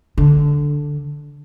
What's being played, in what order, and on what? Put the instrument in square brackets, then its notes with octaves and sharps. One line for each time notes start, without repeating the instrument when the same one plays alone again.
[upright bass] D3